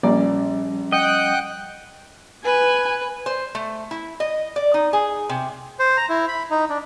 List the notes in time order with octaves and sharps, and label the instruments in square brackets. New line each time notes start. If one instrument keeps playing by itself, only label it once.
[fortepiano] A#1 A#2 D5 [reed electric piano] F3 G3 C#4
[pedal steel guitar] D#5 [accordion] F#5 G5 F#6
[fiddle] B4 [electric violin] G#5
[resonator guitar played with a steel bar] C5
A3
E4
D#5
D5
D#4
G#4
C3
[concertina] C5
A#5
E4
B5
D#4
D4